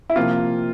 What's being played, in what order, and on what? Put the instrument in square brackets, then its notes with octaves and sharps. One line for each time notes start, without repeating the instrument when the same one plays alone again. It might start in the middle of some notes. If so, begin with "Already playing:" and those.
[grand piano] E4
C3 F3 A#3 F4